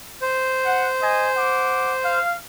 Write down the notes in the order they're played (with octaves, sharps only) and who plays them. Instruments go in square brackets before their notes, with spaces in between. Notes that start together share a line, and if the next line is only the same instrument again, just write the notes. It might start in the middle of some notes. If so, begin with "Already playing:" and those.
[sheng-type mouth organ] C5
[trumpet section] F#5
D#5 G#5
F#5 D6
F5